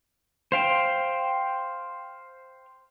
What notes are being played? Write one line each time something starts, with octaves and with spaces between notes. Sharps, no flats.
C5 F5 G5